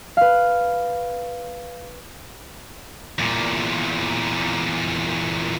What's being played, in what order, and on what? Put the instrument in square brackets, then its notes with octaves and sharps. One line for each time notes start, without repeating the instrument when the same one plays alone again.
[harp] B4 F5
[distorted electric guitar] E2 A#2